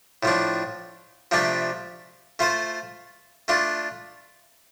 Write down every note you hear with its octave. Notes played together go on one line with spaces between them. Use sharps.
A2 F3 D4
C3 F3 A3 D4 G4
A3 F4 C5
A3 D4 F4